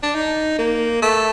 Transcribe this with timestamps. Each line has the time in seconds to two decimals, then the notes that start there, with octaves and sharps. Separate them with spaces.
0.03 D4
0.15 D#4
0.59 A#3
1.02 A3